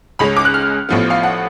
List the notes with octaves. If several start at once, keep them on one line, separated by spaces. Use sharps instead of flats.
C#2 C#3 G#3 C#4 B5
D6
F#6
F6
A1 A2 F3 B3
F5
F#5